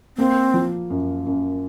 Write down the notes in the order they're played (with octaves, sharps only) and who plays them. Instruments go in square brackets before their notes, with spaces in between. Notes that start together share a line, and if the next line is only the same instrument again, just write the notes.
[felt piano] A#3 [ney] C4
[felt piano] F3
F#2
F#2